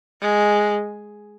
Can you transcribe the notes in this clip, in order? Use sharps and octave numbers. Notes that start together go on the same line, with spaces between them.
G#3